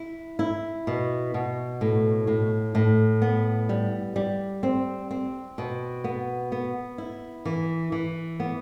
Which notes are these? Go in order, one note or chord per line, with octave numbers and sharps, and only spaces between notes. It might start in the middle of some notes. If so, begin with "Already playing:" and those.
Already playing: E4
E4
B2
B2
A2
A2
A2
B3
G3
G3
C4
C4
B2
B3
B3
E4
E3
E3
B3